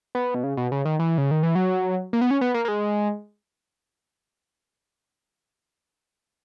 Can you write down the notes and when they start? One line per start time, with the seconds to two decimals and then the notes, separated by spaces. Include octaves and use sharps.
0.15 B3
0.35 B2
0.44 C#3
0.57 B2
0.72 C#3
0.85 D#3
0.99 E3
1.18 C#3
1.31 D#3
1.43 E3
1.55 F#3
2.13 A#3
2.21 B3
2.31 C#4
2.41 B3
2.54 A#3
2.65 A#3
2.68 G#3